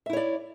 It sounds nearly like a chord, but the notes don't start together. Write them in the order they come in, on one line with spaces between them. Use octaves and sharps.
E5 E4 C#5 D5